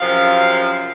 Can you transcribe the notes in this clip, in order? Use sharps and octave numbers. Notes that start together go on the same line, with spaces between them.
F#2 C3 F3 F5